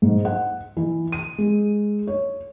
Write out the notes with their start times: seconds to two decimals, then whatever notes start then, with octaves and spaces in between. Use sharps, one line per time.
0.02 G#2
0.25 F#5
0.77 E3
1.12 D#7
1.38 G#3
2.07 C#5